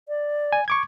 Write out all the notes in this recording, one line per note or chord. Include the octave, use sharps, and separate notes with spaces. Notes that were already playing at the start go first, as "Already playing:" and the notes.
D5
G#5
C#6 D6 G#6